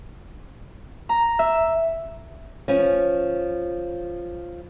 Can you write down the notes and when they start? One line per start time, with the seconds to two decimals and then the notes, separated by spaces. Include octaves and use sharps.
1.09 A#5
1.39 E5
2.68 F3 C#4